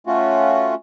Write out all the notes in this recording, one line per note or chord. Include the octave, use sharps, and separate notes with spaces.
A3 C#4 F4 F#4